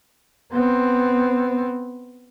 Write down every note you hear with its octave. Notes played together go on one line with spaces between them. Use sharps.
B3 C4